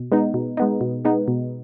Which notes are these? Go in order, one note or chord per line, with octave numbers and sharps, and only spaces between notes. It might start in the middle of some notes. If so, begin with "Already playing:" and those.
Already playing: B2
G#3 B3 D#4
B2
G#3 B3 D#4
B2
G#3 B3 D#4
B2